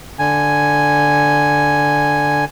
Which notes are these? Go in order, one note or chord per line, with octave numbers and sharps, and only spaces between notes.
D3 G#5